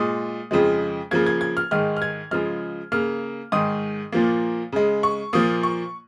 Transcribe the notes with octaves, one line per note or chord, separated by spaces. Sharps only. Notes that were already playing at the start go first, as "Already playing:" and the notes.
Already playing: A#2 G#3 D#6
F2 C#3 F3 G#3
C#3 F3 A#3 G#6
G#6
G#6
F6
G#2 D#3 G#3 F6
F6
G#6
C#3 F3 G#3 F6
C#3 A#3 F6
G#2 D#3 G#3 D#6
A#2 F3 A#3
C#3 G#3
C#6
A#2 F3 A#3 D#6
C#6